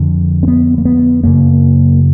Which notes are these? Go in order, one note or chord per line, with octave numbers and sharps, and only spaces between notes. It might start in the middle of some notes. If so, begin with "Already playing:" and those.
Already playing: F2 D3
C4
B3
A#3
B3
F#2 C#3 A#3